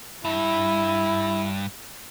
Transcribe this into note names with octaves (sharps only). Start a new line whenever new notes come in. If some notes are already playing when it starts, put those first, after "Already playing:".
G2 E4